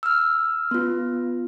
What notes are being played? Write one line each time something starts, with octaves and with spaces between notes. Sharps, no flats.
E6 F6
B3 F4